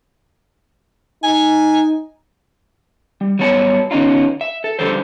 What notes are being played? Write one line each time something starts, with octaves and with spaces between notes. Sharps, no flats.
D#4 G#5
G3
F#3 G3 B3 C#5 A5
D3 B3 C#4 D#4 F4
E5
A4
D3 F3 G3 A4 C5